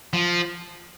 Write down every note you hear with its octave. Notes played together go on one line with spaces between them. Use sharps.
F3